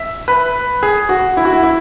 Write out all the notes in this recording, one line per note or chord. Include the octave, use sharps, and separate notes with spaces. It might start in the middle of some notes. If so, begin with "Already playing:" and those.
Already playing: E5
B4
G#4
F#4
E4
F#4
E4
E4